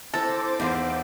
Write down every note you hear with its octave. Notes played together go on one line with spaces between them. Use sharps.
C4 E4 A4 C5 A#5 D6
E2 D#4 F5